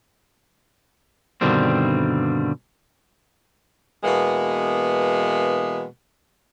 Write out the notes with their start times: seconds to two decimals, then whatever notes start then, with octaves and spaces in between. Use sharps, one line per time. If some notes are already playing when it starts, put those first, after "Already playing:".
1.41 G2 B2 D3 D#3 G3 C4
4.04 B2 E3 G#3 A#3 B3